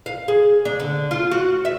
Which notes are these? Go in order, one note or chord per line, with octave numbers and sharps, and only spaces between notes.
F5
G#4
D4
D3
F4
F#4
E5